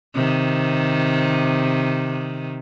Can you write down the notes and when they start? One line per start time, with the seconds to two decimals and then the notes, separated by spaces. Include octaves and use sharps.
0.15 C3 D#3